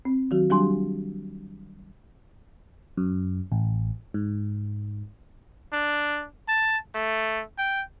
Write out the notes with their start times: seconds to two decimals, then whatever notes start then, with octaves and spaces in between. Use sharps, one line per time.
0.05 C4
0.31 D#3 F#3 F#4
0.50 F#3 G3 D4 G4 G#5 C6
2.97 F#2
3.52 A1
4.14 G#2
5.73 D4
6.48 A5
6.95 A3
7.58 G5